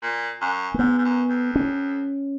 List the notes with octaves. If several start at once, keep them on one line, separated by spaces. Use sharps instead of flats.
A#2
F#2
A#3
G#2 B3
G#2
F#2
F2
C#4